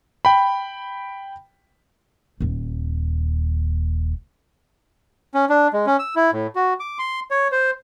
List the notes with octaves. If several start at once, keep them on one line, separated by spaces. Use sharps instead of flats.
G5 B5
D#1 D#2
C#4
D4
G#3
C#4
E6
E4
A2
F#4
D6
C6
C#5
C5